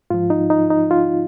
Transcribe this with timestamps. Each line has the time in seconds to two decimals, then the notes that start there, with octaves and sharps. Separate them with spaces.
0.10 G#2 F3 F4
0.30 D#4
0.50 D#4
0.70 D#4
0.91 F4